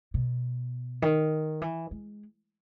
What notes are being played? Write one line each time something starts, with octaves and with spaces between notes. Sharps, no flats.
B2
D#3
E3
G#3